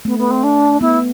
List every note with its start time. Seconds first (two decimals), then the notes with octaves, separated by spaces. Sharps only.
0.05 A3 B3
0.18 B3
0.30 C4
0.43 D4
0.81 B3 E4